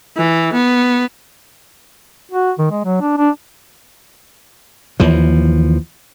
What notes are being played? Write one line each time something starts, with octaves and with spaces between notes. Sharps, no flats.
E3
B3
F#4
D#3
G#3
F#3
D4
D4
D#2 E3 F3